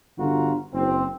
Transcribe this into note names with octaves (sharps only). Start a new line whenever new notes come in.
G1 D3 D4 F4 F#4 A#5
F#1 C4